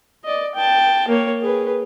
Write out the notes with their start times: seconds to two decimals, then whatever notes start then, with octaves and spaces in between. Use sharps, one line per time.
0.24 D5 D#5
0.55 G5 A5
1.08 A#3 C#5
1.41 G#4 B4